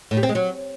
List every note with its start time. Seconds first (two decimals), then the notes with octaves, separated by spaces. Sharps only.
0.11 A2
0.17 G3
0.23 C4
0.29 G#3
0.35 F#3